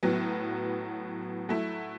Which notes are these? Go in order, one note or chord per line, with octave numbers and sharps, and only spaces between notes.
A2 F#3 B3
F#3 A3 E4